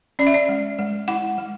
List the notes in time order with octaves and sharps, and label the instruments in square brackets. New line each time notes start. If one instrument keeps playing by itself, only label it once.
[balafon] C#4 D5
E5
D5
G#3
G#3
E4 F#5
G#3